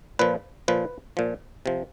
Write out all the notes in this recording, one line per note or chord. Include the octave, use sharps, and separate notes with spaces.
A#2 F3 B4
A#2 F3 B4
A#2 F3
C3 F3